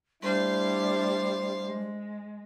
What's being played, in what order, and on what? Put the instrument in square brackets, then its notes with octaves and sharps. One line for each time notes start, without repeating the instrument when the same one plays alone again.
[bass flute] G3 [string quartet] A3 D4 E4 [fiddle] C5 F5
[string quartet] G#3